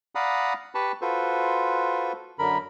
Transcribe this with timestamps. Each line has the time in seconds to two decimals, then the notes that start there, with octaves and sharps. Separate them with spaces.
0.15 D5 F5 F#5 A#5 B5 D#6
0.75 G4 B4 A5 B5 C#6
1.01 F4 F#4 A4 B4 C5
2.39 F#2 D3 A#4 B5